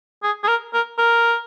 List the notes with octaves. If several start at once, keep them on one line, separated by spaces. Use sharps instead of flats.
G#4
G#4
A#4
A#4
A#4